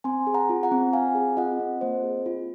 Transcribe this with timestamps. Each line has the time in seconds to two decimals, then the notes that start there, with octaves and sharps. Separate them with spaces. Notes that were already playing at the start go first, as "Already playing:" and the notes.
0.04 C4 G#5 C6
0.27 G#4
0.34 F#5 A#5
0.50 F4
0.63 F#5 A#5
0.72 C4
0.93 C4 F5 G#5
1.15 G#4
1.37 F4 D#5 F#5
1.59 C4
1.81 A#3 C5 D#5
2.03 G#4
2.26 F4